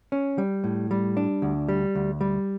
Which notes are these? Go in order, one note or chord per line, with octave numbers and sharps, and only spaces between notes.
C#4
G3
A2
G3
D4
D2
G3
D2
G3